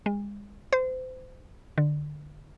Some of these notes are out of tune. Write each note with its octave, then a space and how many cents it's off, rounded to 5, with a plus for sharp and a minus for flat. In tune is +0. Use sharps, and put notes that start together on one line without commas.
G#3 -35
C5 -30
D3 +15